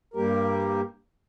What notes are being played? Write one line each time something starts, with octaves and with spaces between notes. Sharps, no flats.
G2 G3 A#3 G4 A#4